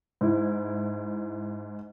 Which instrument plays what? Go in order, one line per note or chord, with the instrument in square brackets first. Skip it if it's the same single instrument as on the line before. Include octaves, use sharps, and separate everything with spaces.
[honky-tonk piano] G#2 E4